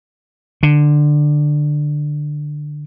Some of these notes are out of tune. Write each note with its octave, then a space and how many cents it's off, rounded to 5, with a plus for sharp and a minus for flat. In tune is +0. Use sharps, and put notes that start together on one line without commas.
D3 +15